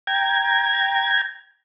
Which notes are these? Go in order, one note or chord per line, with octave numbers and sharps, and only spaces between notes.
G5 A#5 G#6